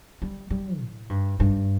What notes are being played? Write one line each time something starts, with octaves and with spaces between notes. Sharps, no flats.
G3
G3
A2
G2
G2